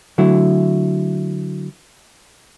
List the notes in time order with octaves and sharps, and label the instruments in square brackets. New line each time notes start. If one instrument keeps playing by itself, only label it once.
[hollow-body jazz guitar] D3 F#3 A3 E4